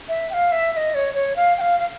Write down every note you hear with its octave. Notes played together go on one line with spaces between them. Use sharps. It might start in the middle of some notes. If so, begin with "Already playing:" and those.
E5
G5
F5
E5
E5
D#5
C#5
C#5
F5
G5
F5
F5